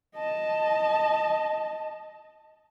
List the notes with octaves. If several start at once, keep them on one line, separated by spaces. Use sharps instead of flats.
D#5 A5